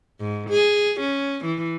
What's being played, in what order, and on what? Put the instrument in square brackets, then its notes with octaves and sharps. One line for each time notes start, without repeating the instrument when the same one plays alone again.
[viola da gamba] G#2
G#4
C#4
E3